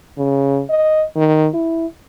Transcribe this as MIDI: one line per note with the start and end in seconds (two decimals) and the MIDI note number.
0.18 0.62 49
0.70 1.05 75
1.16 1.49 51
1.54 1.86 64